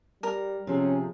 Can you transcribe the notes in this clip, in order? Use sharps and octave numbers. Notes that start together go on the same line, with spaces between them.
G3 A#4
C3 F3 C#4 G#4